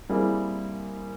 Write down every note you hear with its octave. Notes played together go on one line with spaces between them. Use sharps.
G3 A#3 C4 E4 G#4